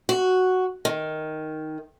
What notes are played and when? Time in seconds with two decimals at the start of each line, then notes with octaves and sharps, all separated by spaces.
0.09 F#4
0.85 D#3